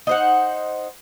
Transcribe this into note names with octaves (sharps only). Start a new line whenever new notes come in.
D#4 C5 F#5